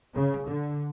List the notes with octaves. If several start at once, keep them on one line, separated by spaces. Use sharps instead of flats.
C#3
D3